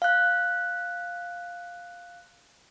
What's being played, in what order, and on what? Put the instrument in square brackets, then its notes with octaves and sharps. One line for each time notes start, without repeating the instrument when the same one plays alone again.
[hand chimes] F5 F#6